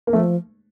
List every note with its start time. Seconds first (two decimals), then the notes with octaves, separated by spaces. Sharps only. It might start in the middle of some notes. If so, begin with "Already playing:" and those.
0.07 A#3
0.13 F3 A3